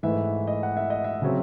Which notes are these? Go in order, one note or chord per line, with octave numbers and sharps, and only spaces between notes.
G#2 E3 A3 E5
D#5
F#5
E5
D#5
E5
C#3 F#3 C4